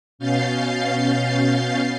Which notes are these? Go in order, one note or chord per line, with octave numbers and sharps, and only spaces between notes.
B2 C#4 F5 G6 A6 C7